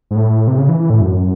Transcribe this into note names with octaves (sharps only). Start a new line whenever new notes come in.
G#2
A2
C3
C#3
E3
E3
A2
F#2